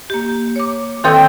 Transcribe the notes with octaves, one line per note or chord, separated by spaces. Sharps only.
A#3 G4
C#5 D6
D#3 C4 A4 C#5 G5 D#6